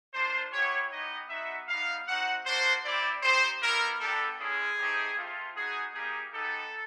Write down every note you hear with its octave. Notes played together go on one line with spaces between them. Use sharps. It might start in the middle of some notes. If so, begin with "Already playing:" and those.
A#3 D4 F4 C5
B3 E4 G4 C#5
B3 D#4 G4 D#5
B3 D#4 F#4 E5
G3 B3 D#4 F5
C4 D#4 F#4 F#5
A#3 D4 F#4 C5
C4 E4 G4 D5
C4 D#4 G4 C5
G3 B3 E4 A#4
G3 B3 D4 G4 A4
G#3 C#4 E4 G#4
A3 C4 D#4 G4
A3 C4 F4
B3 D#4 F#4 G#4
G3 A#3 D#4 G4 G#4
B3 D#4 G4 A4